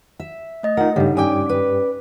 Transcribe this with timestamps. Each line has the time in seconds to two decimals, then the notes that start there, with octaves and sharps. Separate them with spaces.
0.20 E5
0.63 A3 D#5 A#6
0.77 D#4 F4 A#4 F#5
0.96 G2 C#3 D#4 G4 A4
1.17 C#4 D5 G5 G#5 D6
1.49 B4